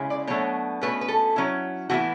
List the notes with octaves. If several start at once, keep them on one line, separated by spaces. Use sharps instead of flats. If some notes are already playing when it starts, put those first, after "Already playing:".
Already playing: C#3 G#3 C#4 E4
D5
B2 F#3 A3 D4 C#5
B2 A3 C#4 B4
B4
A4
F#3 C#4 E4
A2 E3 B3 E4 F#4